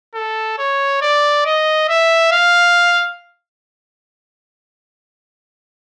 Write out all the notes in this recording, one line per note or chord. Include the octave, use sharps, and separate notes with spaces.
A4
C#5
D5
D#5
E5
F5